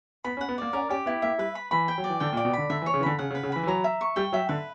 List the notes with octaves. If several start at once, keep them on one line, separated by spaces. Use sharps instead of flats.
B3 B5
C#4
F#5
B3
A#3 D5
C#4 A#4
C#4 G4
B3 E4
A#3 E5
G3 B4
B5
E3 B5
G5
F#3
D5
E3
D3 G5
A#2
D5
B2
D3 B5
D3 E5
E3
C#5
C#3
E3
D3 B5
C#3 F#5
C#3
B4
C#3
E3 B5
E3
F#3 A#5
E5
C#6
G3 G5
F#3 E5
D3 B4